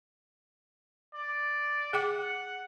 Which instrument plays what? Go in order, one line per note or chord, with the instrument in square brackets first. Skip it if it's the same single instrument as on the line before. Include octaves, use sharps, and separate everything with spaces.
[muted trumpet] D5
[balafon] G#4 G5 D6 [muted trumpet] F#5